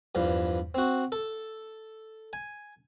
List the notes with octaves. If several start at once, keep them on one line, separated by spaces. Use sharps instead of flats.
E2 G2 F3
C4 F#4
A4
G#5